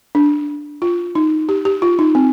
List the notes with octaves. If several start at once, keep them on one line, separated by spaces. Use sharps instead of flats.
D4
F4
D#4
G4
G4
F4
D#4
C4